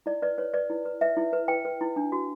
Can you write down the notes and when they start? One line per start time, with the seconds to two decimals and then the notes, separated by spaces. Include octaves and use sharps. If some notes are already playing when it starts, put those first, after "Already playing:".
0.06 E4 D5
0.22 B4 D5
0.38 B4 C#5
0.54 B4 D5
0.70 E4
0.85 B4
1.01 B4 E5
1.17 E4
1.33 B4
1.48 B4 G5
1.65 B4
1.81 E4
1.96 D4
2.12 F#4